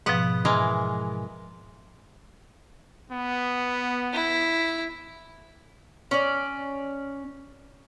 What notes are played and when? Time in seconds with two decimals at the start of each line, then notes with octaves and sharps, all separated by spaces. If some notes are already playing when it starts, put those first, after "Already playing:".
0.06 G#2 B2 F3 B3 F#5
0.45 E3 G#3 A#4
3.10 B3
4.13 E4
6.11 C#4 D5